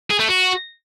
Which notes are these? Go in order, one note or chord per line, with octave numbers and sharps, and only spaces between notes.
G#4
A3
F#4